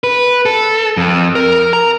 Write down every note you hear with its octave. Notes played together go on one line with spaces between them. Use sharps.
B4
A4
F2
A#4
A#5